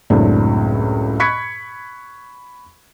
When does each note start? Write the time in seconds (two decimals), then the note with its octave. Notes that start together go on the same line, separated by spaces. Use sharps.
0.10 C#2 F#2 A2 C4 D4
1.20 B5 C#6 F#6 G#6 B6 C#7